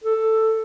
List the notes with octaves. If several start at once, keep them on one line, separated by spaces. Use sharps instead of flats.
A4